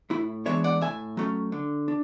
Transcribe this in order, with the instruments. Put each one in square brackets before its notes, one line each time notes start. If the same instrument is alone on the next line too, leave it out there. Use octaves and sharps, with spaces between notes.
[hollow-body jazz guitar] A2 E4
E3 G#3 B3 D4 C#5 E5
D5 F#5
A2 E5 G#5
F#3 A3 C#4
D3
D4